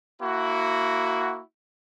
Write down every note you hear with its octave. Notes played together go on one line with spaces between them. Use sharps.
A#3 E4 F#4